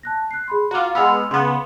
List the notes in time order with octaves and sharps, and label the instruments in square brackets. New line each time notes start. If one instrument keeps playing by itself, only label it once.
[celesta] A5 F#6 A#6
F#6 C7
G#4 B5 C6
[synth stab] F4 F#4 [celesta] A#5 D6
[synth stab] G#3 B3 [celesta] E6 F6 F7
[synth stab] C#3 B3 [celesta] C6